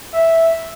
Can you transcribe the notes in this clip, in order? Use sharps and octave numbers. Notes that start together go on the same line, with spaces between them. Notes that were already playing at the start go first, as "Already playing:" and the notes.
E5